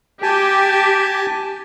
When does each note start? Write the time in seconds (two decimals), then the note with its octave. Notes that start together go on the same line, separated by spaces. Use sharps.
0.23 G4 G#5 A5